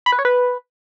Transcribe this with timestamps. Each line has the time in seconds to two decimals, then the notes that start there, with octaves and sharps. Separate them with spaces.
0.06 B5
0.12 B4
0.19 C#5
0.25 B4